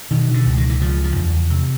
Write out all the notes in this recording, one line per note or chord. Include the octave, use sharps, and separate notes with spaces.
B2 D#3
D3
C#2
D#3
E3
C#3 F3
F3
E2
C3